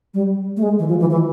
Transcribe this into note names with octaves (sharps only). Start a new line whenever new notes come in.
G3
A3
G#3
E3
F3
E3
E3